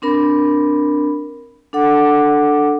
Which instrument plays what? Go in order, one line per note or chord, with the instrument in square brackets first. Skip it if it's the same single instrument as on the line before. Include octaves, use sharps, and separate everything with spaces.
[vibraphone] C4 D4 A#4 B5
D4 A4 F#5 D6